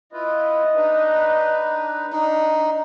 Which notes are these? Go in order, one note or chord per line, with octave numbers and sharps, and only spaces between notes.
E4 F4 B4 D#5
D4 D#4 B4
D4 D#4